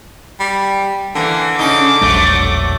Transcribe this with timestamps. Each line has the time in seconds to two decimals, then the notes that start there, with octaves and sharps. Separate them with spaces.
0.40 G3
1.15 D3 E3 A#3
1.59 C#3 C#4 D#4 D6
2.01 E1 A#1 F#3 G3 A3